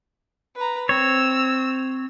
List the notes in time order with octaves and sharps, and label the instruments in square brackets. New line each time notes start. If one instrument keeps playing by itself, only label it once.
[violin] B4 A#5
[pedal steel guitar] C4 C#5 [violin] E6